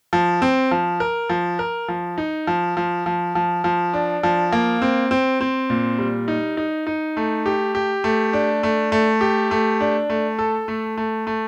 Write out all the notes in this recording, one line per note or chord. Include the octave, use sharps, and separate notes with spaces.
F3
C4
F3
A#4
F3
A#4
F3
D#4
F3
F3
F3
F3
F3
D4
F3
A#3
C4
C4
C4
A#2
G3
D#4
D#4
D#4
A3
G4
G4
A3
D4
A3
A3
G4
A3
D4
A3
A4
A3
A3
A3